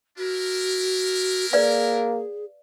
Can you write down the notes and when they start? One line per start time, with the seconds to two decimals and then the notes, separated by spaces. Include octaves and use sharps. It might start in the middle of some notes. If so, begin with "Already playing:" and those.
0.17 D4 E4 F#4 A#4
1.53 A#3 G#4 B4 D5 F5